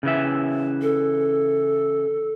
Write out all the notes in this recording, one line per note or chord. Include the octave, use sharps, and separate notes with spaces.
C#3 E3 E5
A4